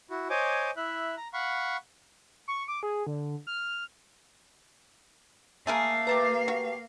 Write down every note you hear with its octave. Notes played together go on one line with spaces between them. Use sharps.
E4 F#4
C5 C#5 D#5 G#5 D6
E4 E5 F#6
A#5
F5 F#5 B5 C#6
C#6
D6
G#4
D3
F6
A3 A#3 G#4 A#4 F5 G#5 D#6
G4 B4 A5 A#5
F#4